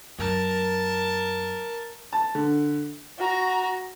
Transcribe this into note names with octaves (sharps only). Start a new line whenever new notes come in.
F#2 A#4 A5
A5
D3
F#4 A#5